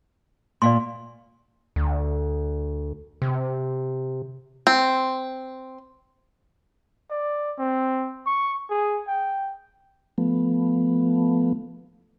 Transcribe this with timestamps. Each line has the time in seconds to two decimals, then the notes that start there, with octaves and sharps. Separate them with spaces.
0.62 A#2 D5 F5 C6
1.76 D2
3.22 C3
4.67 C4
7.10 D5
7.58 C4
8.26 C#6
8.70 G#4
9.07 G5
10.18 F3 A3 B3